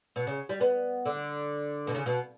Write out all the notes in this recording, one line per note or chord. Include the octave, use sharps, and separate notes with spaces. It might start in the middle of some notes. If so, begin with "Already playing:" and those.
B2
C#3
G3
B3
D3
B2
C#3
B2